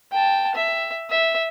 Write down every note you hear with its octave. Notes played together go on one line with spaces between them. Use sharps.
G5 A5
E5
E5